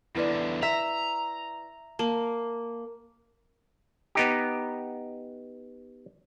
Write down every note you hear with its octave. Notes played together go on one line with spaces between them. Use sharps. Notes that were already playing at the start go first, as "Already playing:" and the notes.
E2 D3 E4 B4 D5
E5 A#5
A#3 A5
B3 D#4 G4